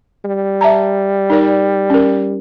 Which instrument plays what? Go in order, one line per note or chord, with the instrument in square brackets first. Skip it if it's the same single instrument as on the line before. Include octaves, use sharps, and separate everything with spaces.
[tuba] G3
[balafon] E5 A5 A#5
D#4 A#4 D5
C#4 A#4